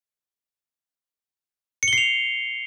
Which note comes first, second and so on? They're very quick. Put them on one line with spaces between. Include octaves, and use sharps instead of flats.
C#7 G7 C7 F7